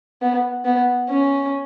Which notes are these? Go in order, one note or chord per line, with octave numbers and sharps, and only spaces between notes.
B3
B3
C#4